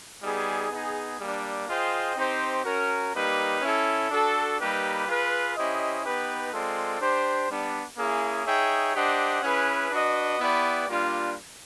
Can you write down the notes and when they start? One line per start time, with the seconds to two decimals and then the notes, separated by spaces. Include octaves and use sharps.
0.22 G3 B3 D#4 G#4
0.71 B3 D#4 G#4
1.19 G3 A#3 D4
1.68 F4 G#4 C5 D#5 G5
2.16 C4 D#4 G4 C5
2.64 C#4 F#4 A#4
3.13 G3 A#3 D#4 G4 B4
3.61 C#4 E4 A4
4.10 D4 F#4 A4
4.58 G3 A#3 D#4 G4 B4
5.07 F4 G#4 B4
5.55 C#4 E4 G4 C5 D#5
6.04 B3 D#4 G4 B4
6.52 G#3 C4 F4 A4 D5
7.00 D4 G4 C5
7.49 G3 B3 D4
7.97 A#3 C#4 E4 G#4
8.46 D#4 G#4 C#5 E5 G5
8.94 D4 G4 C5 D#5 F#5
9.42 C#4 E4 G#4 B4
9.91 D4 F#4 B4 D#5
10.39 B3 E4 G4 B4 D5
10.88 G3 A#3 D4 F4